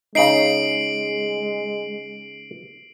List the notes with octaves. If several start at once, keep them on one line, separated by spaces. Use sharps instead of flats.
C#3 G#3 D#4 C7 D7 F#7